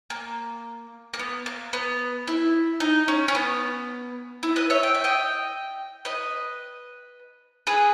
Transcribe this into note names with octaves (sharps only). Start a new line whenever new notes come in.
A#3
A#3
B3
A#3
B3
E4
D#4
C#4
C#4
B3
E4
B4 D#5
C#5 E5
G5
E5
D#5 G5
B4 D#5
G#4 B4